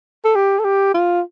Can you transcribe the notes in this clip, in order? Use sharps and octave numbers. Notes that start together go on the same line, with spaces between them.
A4
G4
A4
G4
F4